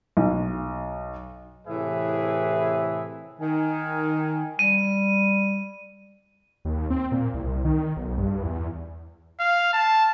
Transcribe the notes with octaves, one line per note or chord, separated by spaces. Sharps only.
B1
A2 C3 E3 G#4 B4 E5
D#3 G#5
G3 D#7
D#2
C4
A#2
C2
D#3
B1
G2
E2
F5
A5